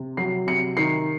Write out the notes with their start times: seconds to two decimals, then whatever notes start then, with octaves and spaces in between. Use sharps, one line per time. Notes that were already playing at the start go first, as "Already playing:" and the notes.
Already playing: C3
0.17 F#3 C7
0.47 C3 C#7
0.77 D#3 C7